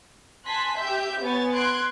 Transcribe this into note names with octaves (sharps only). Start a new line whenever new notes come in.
G#5 A5 C6 F#6 B6
G4 E5 G6
B3 C#5 G#5 A6
C6 F#6 G#6 D7